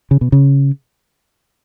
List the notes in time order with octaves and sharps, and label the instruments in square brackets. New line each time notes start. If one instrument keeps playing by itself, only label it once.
[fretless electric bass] C#3
B2
C#3